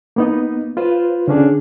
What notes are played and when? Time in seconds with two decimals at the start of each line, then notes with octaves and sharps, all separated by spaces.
0.16 A#3 B3 D#4
0.77 F4 B4 C5
1.28 D3 C#4 D4 G#4